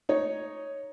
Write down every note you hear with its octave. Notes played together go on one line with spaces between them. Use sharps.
D#4 C#5